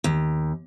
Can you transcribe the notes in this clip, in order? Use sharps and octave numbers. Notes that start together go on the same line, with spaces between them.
D#2